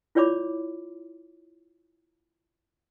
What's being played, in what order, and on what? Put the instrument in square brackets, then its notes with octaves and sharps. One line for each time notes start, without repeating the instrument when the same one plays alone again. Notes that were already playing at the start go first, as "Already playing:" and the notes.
[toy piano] E4 F4 C#5 D5 B5 D6